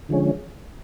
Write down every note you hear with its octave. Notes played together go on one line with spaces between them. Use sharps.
D3 F3 G#3 C#4